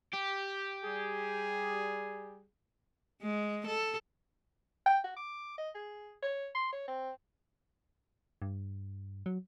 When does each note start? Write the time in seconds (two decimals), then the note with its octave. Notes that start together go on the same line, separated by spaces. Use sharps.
0.13 G4
0.84 G3 G#4
3.22 G#3
3.67 A4
4.86 G5
5.04 F#4
5.17 D6
5.58 D#5
5.75 G#4
6.23 C#5
6.55 C6
6.72 C#5
6.88 C4
8.42 G2
9.26 F#3